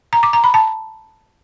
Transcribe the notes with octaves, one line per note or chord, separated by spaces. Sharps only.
A#5
D6
A#5
B5
A5